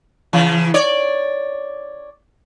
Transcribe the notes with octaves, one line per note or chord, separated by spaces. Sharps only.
C#3 E3
C#5 D5